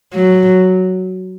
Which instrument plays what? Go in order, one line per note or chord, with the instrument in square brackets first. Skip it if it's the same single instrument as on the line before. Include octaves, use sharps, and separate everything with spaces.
[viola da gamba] F#3